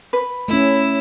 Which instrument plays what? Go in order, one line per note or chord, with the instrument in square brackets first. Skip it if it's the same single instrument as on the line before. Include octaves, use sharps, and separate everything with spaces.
[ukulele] B4
[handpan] A3 C#4 [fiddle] E4